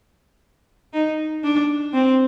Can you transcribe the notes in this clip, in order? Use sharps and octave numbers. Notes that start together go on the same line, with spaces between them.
D#4
D4
C4